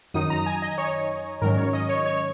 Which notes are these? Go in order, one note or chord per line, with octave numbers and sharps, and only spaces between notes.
F#2 D#3 F#3 D#4 D#6
A#5
G#5
D#5
C#5
G#2 D#3 F#3 C#4 A#4
C#5
D#5
C#5
C#5